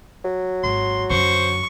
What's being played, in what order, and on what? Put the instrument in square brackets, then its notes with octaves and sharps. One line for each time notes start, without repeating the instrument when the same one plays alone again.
[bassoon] F#3
[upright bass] G#1 [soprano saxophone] C6
[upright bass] F#2 D3 [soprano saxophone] C5 [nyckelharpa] C#6